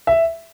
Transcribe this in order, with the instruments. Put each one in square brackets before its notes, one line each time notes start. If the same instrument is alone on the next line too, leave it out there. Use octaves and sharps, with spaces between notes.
[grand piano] E5